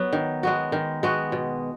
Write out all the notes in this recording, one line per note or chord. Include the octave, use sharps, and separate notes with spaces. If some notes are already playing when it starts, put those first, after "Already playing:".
Already playing: F#3 B3
D#3
G#3 B3 F#4
D#3
G#3 B3 F#4
B2